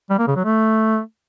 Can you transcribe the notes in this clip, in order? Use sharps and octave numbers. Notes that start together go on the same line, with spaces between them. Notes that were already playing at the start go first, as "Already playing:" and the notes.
G3
A#3
C#3
F#3
A3